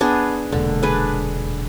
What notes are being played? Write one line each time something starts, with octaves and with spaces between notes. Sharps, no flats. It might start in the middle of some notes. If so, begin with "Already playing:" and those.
B3 D4 G#4
E1 A#2 D3
D4 G#4 B4